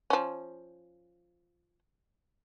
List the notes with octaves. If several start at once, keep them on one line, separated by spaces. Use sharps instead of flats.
F3 C#4